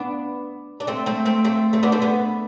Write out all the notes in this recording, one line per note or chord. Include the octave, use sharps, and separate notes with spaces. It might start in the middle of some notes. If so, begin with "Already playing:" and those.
Already playing: B3 D4
D4
A3 C4
A3 C4
A3 C4
A3 C4
A3 C4
B3 D4
A3 C4
B3 D4